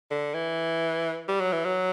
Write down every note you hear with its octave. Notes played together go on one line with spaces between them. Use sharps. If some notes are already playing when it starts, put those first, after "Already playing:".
D3
E3
G3
F#3
E3
F#3